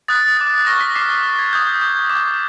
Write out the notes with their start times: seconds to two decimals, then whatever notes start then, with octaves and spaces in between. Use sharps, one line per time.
0.08 D#6 F#6 A6
0.37 D6 F#6 A6
0.66 C#6 F6 A#6
0.81 B6
0.96 D6 F6 C7
1.23 D6 F6
1.39 G#6
1.53 D#6 G6
1.81 D6 G6
2.10 D6 G6